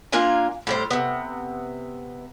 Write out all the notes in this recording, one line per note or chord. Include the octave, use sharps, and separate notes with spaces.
A#3 D4 F4 G#5
A2 G3 C5
C3 B3